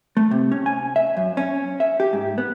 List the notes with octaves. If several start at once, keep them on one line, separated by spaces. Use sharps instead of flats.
A3
C3
C#4
G#5
E5
F#2
C#4
E5
G4
G#2
B3